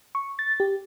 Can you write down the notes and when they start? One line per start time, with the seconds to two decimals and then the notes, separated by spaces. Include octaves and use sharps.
0.15 C#6
0.39 A6
0.60 G4